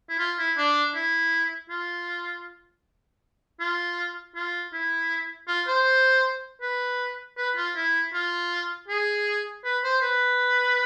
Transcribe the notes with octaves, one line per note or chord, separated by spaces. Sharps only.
E4
F4
E4
D4
E4
F4
F4
F4
E4
F4
C5
B4
B4
F4
E4
F4
G#4
B4
C5
B4